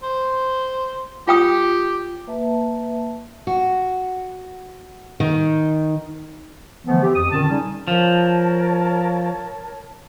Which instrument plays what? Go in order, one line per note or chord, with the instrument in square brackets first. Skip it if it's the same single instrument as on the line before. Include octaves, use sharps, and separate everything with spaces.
[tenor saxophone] C5
[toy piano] F4 G5 D#6 [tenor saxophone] G4
[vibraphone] A#3 B4 E5 A5
[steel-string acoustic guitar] F#4
D#3
[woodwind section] D3 E3 F3 A3 B3
C4 G4
F2 D#6
A#2 D3 D#3 C#4 A5
C#3 G3 C#4 D#4
[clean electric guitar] F3 [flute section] A#4 C#5 A5